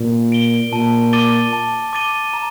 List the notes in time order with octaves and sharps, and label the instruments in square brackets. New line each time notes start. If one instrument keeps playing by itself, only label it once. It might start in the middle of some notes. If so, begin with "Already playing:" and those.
Already playing: [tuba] A#2
[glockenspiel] D7 G7
[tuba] A#2 [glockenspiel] A5
[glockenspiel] D6 A6 D#7 G7
A5
D6 A6 D#7 G7
A#5